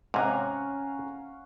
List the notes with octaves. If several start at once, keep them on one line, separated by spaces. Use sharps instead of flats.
G#2 C3 C#4 F5 F#5 G#5 A#5